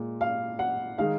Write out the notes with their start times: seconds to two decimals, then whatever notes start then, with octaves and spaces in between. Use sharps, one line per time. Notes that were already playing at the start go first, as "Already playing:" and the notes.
Already playing: A#2 G#3
0.21 F5
0.59 F#5
0.98 D#3 G#3 D#4 F5